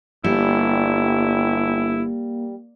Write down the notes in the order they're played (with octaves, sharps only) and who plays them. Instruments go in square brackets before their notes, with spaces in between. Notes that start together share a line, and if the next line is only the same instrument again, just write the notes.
[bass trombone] G1 [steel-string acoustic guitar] G3 [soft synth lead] A#3 [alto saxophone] E4